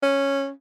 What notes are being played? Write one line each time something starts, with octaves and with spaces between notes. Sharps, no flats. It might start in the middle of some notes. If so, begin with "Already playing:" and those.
C#4